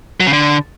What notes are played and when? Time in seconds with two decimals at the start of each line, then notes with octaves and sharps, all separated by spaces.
0.20 F#3
0.27 C#3
0.33 D3